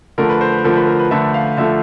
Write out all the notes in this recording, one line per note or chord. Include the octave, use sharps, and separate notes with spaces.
D3 F3 A3 A#4
B4
C5
B4
D3 F3 A3 A#4
B4
A#4
B4
D3 F3 A3 E5
F5
D3 F3 A3 E5